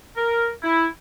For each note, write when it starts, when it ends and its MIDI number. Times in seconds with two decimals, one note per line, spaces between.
0.17 0.49 70
0.63 0.85 64